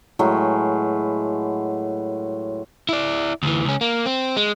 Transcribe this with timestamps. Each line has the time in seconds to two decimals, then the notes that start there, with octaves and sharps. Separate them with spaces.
0.19 A2 F#3 G#3 B4
2.89 E4 D5
3.43 D2 E3
3.65 C#2 C#4
3.81 A#3
4.06 C4
4.37 G#3